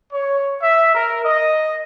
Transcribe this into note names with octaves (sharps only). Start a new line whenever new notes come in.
C#5
E5
A#4
D#5